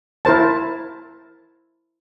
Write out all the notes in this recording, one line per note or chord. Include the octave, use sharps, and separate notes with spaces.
E4 A#4 C5 A5